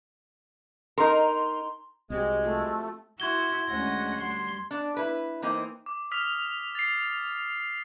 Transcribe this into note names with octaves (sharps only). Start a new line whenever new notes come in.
D#4 A#4 A#5 C6
C2 G#3 C4 F#4 G4
A3 F4
E4 F#4 C6 G#6 G7
D2 G#3 C#4 F#5 A#6
G3 C6
D4
E4 B4
E3 A#3 C4 D#4
D6
D#6 F6 B6 F7
A6 C7